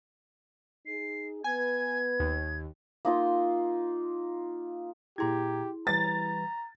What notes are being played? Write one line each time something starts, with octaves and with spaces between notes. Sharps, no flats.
D#4 G#4 C7
B3 B4 G#5 G#6
D#2
A#3 D#4 F4 C6
A#2 E4 G4 G#4 A#5 C6 G#6
E3 G3 B4 A#5 A6